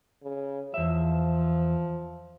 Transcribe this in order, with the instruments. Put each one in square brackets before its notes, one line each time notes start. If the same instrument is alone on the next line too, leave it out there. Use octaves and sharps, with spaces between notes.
[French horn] C#3
[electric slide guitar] E2 E5 [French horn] F3